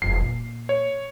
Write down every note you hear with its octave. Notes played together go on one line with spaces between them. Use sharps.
F1 C2 C7
A#2
C#5